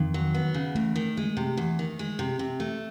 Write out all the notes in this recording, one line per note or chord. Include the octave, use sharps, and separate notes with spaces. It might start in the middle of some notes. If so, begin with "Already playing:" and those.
Already playing: F2 D#3
F#3
B3
C#3
E2 A3
D#3
G#3
C3
E2
D#3
G#3
C3
C3
A3